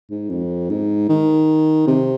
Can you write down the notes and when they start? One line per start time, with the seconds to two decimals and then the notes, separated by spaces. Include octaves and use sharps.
0.10 G#2
0.30 F2
0.69 G#2
1.09 D#3
1.87 C3